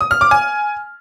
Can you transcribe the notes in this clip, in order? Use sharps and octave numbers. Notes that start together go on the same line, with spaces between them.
D#6
F6
D6
G#5